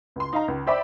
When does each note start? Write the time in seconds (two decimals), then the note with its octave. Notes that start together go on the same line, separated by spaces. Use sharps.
0.16 C#2 C6
0.33 D#4 F5 A#5
0.48 C#2
0.67 C5 D5 E5 G5 B5 D6